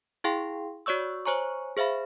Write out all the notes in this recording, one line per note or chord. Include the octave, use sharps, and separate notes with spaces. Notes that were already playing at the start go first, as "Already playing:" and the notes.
E4 G#4 F5 G5 C6
F#4 C#5 D5 C#6 E6
C5 C#5 G#5 A#5 C#6
G#4 C5 E5 F5 B5